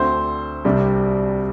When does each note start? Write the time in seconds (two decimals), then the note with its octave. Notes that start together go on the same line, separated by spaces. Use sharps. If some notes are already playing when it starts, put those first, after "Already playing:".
Already playing: D2 D3 C4 C5
0.65 C2 C3 G3 D4